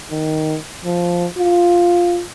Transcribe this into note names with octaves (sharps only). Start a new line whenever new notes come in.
D#3
F3
F4